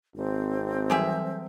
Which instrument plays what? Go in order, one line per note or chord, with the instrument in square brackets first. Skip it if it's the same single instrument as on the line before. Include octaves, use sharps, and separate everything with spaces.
[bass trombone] G#1 [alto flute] C4
[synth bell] E3 F#3 G3 [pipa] G4 G#4 E5